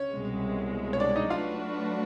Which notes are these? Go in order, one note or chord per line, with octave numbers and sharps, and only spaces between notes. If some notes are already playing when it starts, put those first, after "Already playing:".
Already playing: C#4 C#5
C2 B2 G#3
C#5
D4 D5
D#4 D#5
F#3 A3 D4 F4 F#4 B4 F5